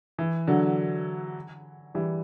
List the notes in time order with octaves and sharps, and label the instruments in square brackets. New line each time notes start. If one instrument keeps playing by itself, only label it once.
[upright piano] E3
D3 F#3
E3 G3